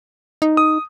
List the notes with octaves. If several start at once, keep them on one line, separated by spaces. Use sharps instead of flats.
D#4
D#6